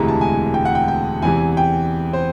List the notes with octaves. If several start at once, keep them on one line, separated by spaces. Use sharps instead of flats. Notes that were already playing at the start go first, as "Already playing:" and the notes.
Already playing: E1 D2 C3 E3 G#3 A#5
A5
G#5
G5
F#5
G5
G5
E2 C3 E3 G#5
G5
C5